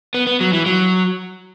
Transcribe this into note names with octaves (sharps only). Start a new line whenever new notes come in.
B3
B3
F#3
E3
F#3